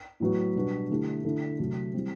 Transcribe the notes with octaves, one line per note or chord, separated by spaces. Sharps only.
A2 F#3 B3 F#4
B2 G3 B3 D4 F#4
D3 A3 E4 G4
D3 A3 E4 A4
C3 F#3 A3
E3 G3 C4